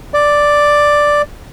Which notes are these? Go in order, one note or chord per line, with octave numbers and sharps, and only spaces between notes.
D5